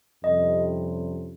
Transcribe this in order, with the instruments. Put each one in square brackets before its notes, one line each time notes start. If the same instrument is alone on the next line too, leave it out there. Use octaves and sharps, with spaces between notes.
[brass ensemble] F2 C3 G3 C#4 [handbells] D#5